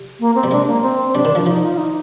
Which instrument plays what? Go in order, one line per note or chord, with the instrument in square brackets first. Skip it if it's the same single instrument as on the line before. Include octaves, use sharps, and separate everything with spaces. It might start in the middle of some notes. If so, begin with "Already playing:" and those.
Already playing: [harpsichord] G3
[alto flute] A#3
C4
[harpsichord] G3
[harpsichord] G#3 [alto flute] D4
[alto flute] A#3
C4
C4
[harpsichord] G3 [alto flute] D4
[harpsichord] D#3
F3
[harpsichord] F3 [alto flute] D#4
[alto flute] F4
F4
D#4